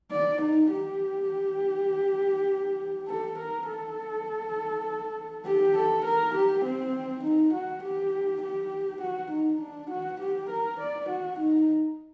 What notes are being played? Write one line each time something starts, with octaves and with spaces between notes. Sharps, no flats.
D5
D#4
G4
A4
A#4
A4
G4
A4
A#4
G4
C4
D#4
F#4
G4
G4
F#4
D#4
D4
F#4
G4
A#4
D5
F#4
D#4